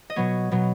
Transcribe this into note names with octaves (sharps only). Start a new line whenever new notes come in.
D#5
B2 F#3 B3 C#5
B2 F#3 B3